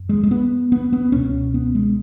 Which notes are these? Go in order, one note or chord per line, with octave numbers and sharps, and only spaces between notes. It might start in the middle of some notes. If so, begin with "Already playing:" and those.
Already playing: F#2
G#3
G#3
B3
B3
B3
C#2 B2 C#4
B3
G#3